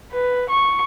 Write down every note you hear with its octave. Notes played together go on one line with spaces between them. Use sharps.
B4
C#6